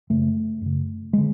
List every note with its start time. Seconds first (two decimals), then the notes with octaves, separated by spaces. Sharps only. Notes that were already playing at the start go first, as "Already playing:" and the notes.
0.10 F#2 C#3 A3
0.61 F#2 C#3
1.13 D3 G#3